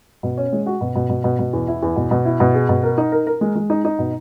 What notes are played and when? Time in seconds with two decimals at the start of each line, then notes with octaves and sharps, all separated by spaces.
0.23 B2
0.37 C#4
0.53 G#3
0.66 F#4
0.81 B2
0.96 B2
1.10 B2
1.24 B2
1.39 B2
1.53 E2
1.68 E4
1.82 E2
1.96 B2
2.11 B2
2.25 E4
2.40 B2
2.54 G#4
2.69 B2
2.83 A#4
2.98 D#4
3.12 A#4
3.27 A#4
3.41 G#3
3.55 G#3
3.70 D#4
3.85 D#4
3.99 B2